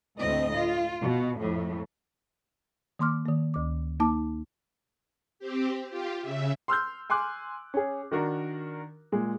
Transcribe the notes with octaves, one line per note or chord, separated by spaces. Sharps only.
D2 A2 C4 D#5
F4
B2
F2 A2
D#3 A#3 C6 D6 F6
D#3 A#3
D2 D6
A#3 D#4 A5 D6
C4 G4
F4 G4
C#3 E5
C6 E6 F6 G6
G#5 C6 D6 F#6
C#4 G#4
D#3 D4 F#4 A#4
A#2 G#3